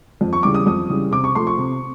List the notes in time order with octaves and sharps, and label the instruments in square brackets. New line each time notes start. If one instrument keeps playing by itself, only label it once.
[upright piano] F2
C#6
C#3 E3 G3 D6
D#6
F2 D#6
C#3 E3 G3
C3 D6
C#6
F3 A3 C6
C#6
C3